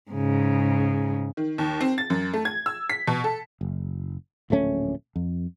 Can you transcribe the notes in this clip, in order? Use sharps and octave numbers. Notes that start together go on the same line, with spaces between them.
G#2 C#3
D#3
D#2
C4
A6
F#2
A3
G#6
E6
B6
B2
A4
F#1
D1 A#1 A3 C#4
F2